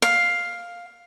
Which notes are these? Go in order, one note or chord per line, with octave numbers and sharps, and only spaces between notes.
F5